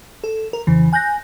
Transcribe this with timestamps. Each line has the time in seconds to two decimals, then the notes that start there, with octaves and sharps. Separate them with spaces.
0.24 A4
0.53 A#4
0.67 F2 C#3 E3
0.93 G#5 F#6 G6 A#6